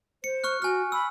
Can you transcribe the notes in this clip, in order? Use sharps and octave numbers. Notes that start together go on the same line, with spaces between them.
C5 C#7
C#6 F6 F#6
F#4 G#5 F6
B5 E6